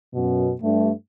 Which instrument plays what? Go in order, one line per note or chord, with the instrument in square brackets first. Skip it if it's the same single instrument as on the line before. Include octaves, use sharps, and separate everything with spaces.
[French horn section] F#2 B2
G2 A3